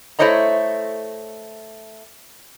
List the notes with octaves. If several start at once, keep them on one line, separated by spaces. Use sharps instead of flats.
A3 E4 C5 C#5 D#5 A#5